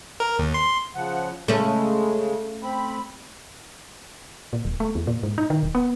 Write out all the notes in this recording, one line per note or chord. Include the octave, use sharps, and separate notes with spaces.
A#4
D#2
C6
C#3 F3 F#5
C#3 G#3 A3 C#4
C4 B5
A#2
D#1
A3
E2
A#2
G#2
D#4
D#3
D#1
B3